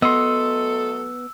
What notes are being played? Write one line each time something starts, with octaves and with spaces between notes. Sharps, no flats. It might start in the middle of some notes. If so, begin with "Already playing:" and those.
F#3 A3 B3 A4 D#5 C6 E6